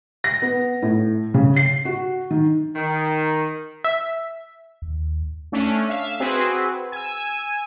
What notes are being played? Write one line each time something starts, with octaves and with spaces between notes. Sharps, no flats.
A#6
B3
A2
C#3
C7
F#4
D#3
D#3
E5
D#2
A3 C#4 D4
E5 F5
C4 F#4 G#4 B4
G#5 E6